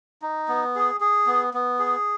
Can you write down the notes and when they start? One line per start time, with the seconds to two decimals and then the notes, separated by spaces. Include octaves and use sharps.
0.22 D#4
0.48 B3
0.75 G#4
1.01 G#4
1.27 B3
1.54 B3
1.79 G#4